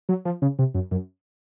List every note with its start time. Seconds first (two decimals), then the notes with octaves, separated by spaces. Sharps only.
0.09 F#3
0.25 F3
0.42 C#3
0.59 C3
0.75 F#2
0.91 F#2